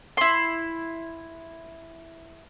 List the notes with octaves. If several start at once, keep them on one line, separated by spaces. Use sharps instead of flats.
E4 C6